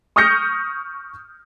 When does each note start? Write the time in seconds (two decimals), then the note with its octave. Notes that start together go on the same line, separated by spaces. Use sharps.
0.16 C#6 D#6 F6 G6 A#6 C#7